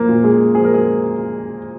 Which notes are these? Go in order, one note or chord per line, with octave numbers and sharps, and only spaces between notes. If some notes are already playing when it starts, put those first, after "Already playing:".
Already playing: F3 A#3 A#4
A#2
G#3 G#4
F3 G#4
A#4
G#3 G#4